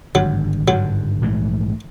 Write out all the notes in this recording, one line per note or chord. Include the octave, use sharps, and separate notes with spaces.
G#1 G2 D3 F#3
G#1 G2 D3 F#3
A#1 G#2 E3 A3